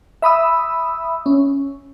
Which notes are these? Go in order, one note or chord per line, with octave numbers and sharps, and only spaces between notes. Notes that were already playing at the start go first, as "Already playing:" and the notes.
E5 B5 D#6 E6
C#4